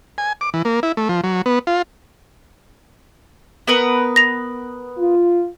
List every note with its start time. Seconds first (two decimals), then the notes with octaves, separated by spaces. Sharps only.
0.18 G#5
0.41 D6
0.54 E3
0.65 A#3
0.83 E4
0.97 A3
1.09 F3
1.24 F#3
1.46 B3
1.67 F4
3.67 B3 A#4 B4
4.16 A#6 F7
4.98 F4